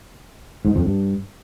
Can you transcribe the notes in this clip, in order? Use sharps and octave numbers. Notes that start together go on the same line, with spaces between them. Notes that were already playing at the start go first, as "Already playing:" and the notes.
G#2
F2
G2